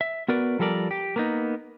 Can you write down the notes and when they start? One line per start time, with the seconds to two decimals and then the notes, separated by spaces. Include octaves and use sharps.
0.01 E5
0.28 B3 F#4 A#4 B4 D5
0.59 F3 G3 A4 A#4 D5
0.91 G4
1.16 A#3 B3 D#4